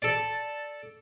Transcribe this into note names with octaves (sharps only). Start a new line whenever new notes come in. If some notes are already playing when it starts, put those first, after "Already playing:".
A4 D5